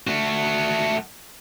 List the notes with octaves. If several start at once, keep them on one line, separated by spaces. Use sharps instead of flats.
A3 F#4